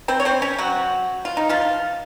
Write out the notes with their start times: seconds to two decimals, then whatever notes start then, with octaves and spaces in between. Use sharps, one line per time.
0.08 C4 C5
0.20 C#5
0.25 C4 C5
0.42 C#4 C#5
0.58 F#3 F#4
1.25 F4
1.37 D#4
1.49 F3 F4